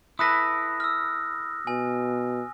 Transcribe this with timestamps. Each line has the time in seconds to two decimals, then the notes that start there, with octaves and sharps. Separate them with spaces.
0.19 E4 A4 B4 D#6 F#6 A#6
0.80 E6 F6
1.67 B2 G#5